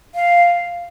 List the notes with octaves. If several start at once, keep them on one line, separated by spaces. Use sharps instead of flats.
F5